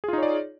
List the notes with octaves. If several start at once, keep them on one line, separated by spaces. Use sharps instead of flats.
D#4 F4 G#4 C#5 D5